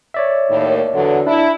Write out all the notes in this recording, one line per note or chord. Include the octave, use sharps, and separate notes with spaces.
C#5 D5 E5
D#2 A2
E2 D3 F#3
D4 E4